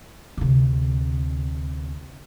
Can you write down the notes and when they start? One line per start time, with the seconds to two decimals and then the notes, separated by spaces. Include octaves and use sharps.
0.37 D2 C3